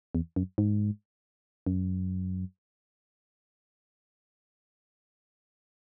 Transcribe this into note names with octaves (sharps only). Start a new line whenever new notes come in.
E2
F#2
G#2
F#2